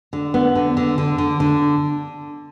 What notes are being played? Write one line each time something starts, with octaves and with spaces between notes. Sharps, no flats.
D3
B3
D3
D3
D3
D3
D3